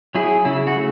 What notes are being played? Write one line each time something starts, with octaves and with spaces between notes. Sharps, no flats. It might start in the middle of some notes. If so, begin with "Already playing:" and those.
F#3 E4 G#4
C#3 E4
F#4
A3